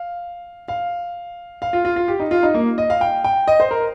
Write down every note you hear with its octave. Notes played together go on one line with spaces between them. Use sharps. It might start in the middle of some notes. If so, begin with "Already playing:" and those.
Already playing: F5
F5
F5
F4
F4
F4
G4
D#4
F4
D#4
A#3
D#5
F5
G5
G5
D#5
C5
A#4